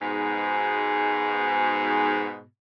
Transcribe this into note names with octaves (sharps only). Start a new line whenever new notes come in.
G#2 B2